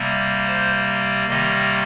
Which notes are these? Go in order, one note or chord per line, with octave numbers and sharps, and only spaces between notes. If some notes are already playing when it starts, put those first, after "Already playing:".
Already playing: C3 G3 A#3
C5
C3 D#3 G3 A#3 D#5